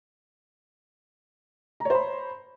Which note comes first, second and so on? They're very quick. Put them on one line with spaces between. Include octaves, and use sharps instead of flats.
A#5 C#5 C5 B5